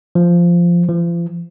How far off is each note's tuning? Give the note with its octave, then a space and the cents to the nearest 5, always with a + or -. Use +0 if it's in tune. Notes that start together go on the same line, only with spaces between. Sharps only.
F3 -10
F3 -40